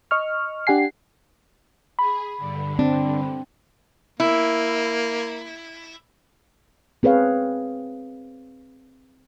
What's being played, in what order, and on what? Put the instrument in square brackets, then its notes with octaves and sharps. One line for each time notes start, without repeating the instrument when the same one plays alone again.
[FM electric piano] D#5 C#6 F6
D4 G4 F#5 G#5 C7
[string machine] G#4 [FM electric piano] B5
[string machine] G2 D3
[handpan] C4 [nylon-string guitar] D4
[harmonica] A#3 [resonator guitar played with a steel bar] E4
[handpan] C4 G#4 B4 C#5 F5